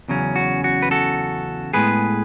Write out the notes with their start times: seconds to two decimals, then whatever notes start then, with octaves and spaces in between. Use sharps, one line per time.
0.08 E2 C#3 F#3 C#4
0.36 F#4
0.64 F#4
0.82 B4
0.91 F#4 A4
1.74 A2 G#3 B3 G#4 B4